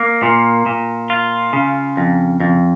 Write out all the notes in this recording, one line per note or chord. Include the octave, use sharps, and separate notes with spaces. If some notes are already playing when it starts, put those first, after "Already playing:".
Already playing: A#3
A#2
A#2
F4
C#3
F2
F2